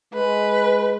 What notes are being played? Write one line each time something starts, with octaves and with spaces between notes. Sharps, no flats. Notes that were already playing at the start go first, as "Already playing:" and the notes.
G#3 B4